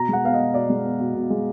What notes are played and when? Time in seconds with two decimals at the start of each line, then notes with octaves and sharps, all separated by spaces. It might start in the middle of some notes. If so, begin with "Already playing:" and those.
Already playing: B2 A#5
0.09 G#3 F#5
0.24 B3 F5
0.34 D#5
0.39 B2
0.54 B2 D5
0.70 G#3
0.85 B3
1.00 B2
1.15 B2
1.30 G#3